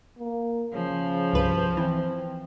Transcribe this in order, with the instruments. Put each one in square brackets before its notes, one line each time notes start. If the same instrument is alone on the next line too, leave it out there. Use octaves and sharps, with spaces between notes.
[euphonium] A#3
[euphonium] C#3 [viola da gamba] F3
[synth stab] C2 G2 B4
[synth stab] E3 [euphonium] C4